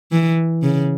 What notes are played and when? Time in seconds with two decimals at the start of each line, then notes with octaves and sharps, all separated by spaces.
0.12 E3
0.63 C#3